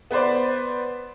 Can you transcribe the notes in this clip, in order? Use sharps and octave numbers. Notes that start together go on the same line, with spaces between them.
B3 B4 C5 D5